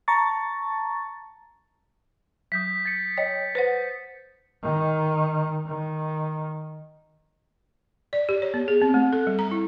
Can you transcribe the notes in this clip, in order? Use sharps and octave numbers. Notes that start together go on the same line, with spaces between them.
A5 A#5 C#6 A6
F#3 D#6 G6 B6
A6 C#7
C#5 D#5 G5
B4 C5 F#5
D#3
D#3
D5
G4
C#5
B3
G#4
C4
A3
A4
G3
A#5
E4